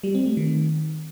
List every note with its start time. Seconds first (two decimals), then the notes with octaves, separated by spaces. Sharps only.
0.03 G3
0.15 C4
0.26 A3
0.37 D#3